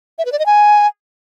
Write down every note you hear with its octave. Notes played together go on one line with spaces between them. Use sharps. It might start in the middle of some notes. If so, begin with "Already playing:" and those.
E5
B4
D5
D#5
G#5